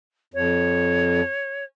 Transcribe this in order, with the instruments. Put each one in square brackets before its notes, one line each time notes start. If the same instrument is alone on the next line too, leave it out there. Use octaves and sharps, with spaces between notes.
[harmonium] F2 [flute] C#5